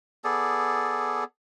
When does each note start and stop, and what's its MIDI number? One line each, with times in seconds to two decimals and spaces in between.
0.24 1.24 59
0.24 1.24 68
0.24 1.24 69
0.24 1.24 74